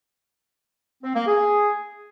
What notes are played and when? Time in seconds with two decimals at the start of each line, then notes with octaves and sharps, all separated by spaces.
1.04 C4
1.15 A#3
1.27 G#4